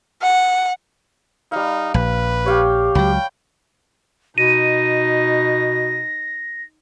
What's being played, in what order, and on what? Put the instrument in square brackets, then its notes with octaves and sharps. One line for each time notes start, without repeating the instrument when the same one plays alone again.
[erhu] F#5
[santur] G3 F5 [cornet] D#4
[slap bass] A#1 [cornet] B4
[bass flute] G4 [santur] C#5 F5 G5
[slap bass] C#2 F#3 [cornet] G5 [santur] B5
[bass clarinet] B2 [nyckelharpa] D#4 [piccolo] A#6 [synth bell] D#7